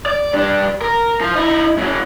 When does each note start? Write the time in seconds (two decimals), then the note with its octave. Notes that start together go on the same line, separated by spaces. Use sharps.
0.06 D5
0.33 G2 D4
0.81 A#4
1.21 F3
1.35 D#4 E4
1.78 C#3 F#3